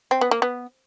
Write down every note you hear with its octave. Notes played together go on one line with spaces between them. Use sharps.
C4
B3
A#3
B3